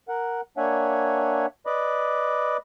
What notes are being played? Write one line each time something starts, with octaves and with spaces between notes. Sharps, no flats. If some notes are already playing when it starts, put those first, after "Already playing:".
A#4 F#5
A#3 D4 C#5 E5 F#5 G#5
B4 D5 D#5 B5 D6